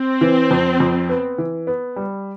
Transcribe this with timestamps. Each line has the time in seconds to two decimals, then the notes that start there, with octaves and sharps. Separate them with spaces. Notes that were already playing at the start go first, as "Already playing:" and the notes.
Already playing: C4
0.21 E3
0.51 F2
0.80 F2
1.09 B3
1.38 E3
1.67 B3
1.96 G3